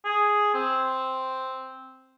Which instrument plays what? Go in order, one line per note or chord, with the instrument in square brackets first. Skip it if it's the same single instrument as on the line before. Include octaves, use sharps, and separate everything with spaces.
[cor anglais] G#4
C4